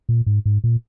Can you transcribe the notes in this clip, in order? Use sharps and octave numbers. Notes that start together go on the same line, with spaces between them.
A#2
G#2
G#2
A#2